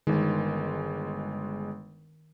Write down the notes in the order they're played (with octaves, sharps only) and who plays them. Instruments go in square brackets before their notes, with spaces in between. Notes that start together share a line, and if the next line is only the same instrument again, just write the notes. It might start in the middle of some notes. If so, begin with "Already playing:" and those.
[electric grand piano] G1 G#3 [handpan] D#3